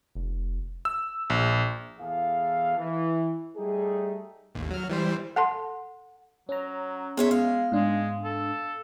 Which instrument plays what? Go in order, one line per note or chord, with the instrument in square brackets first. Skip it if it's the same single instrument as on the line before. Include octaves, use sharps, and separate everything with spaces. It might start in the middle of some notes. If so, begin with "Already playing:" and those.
[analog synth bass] F1
[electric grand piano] E6
A#1
[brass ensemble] E2 E3 G#4 A4 F5
E3
G3 A3 D#4 G4 G#4
[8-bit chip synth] A1 D#2
F#3 F6
E3 G3 C5
[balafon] A4 A5 C6 [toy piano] F#5
[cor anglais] F#3 [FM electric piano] C#4 A#5
[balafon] B3 G#4 [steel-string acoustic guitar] C5 C#5 E5
[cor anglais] G#3 [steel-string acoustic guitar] F5
[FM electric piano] G#2 D4 [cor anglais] G#3
[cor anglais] A4